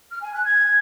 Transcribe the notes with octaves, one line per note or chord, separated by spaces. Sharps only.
F6
G#5
F#6
G#6